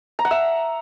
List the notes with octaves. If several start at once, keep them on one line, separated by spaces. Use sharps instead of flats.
A#5
F#5
E5